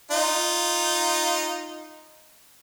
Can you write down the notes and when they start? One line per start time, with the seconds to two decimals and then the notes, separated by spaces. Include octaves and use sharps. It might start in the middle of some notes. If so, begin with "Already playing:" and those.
0.11 D#4 F4